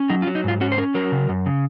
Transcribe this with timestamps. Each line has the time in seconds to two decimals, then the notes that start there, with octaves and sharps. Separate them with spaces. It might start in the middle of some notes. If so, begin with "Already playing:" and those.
Already playing: C#4
0.09 F#3 D#4
0.22 F4
0.27 F#3
0.35 D#4
0.44 G#2 F4
0.61 C#4 F#4
0.72 C5
0.78 C#4 A#4
0.95 F#3 A#4
1.12 C#3
1.29 F#2
1.46 C#3